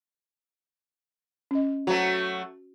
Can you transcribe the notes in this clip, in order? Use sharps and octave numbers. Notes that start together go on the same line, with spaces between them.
C#4 D#5
F#3 A3 F#4 C5